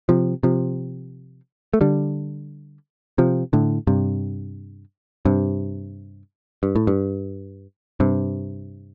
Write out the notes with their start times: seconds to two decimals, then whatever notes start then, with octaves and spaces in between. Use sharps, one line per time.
0.09 C3 F3
0.43 C3 F3
1.74 A3
1.81 D3 G3
3.18 C3 F3
3.53 A2 D3
3.87 G2 C3
5.25 G2 C3
6.63 G2
6.76 A2
6.87 G2
8.00 G2 C3